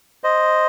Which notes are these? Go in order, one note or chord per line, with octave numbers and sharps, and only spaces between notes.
C5 D#5